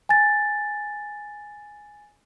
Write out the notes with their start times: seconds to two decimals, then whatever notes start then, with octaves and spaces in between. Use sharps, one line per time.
0.09 G#5 A6